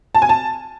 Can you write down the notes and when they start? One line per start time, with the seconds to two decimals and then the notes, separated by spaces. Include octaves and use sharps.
0.15 A5
0.22 G#5
0.29 A5